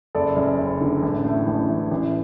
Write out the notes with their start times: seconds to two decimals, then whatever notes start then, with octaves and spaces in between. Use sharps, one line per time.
0.15 F#1 A4 D5
0.36 F#2
0.59 F#1
0.81 D3
1.03 A1
1.25 A2
1.47 A1
1.68 E3
1.91 A1